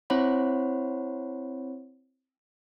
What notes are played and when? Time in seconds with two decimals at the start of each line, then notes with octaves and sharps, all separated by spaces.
0.10 C4 E4 C5 C#5 F#5 B5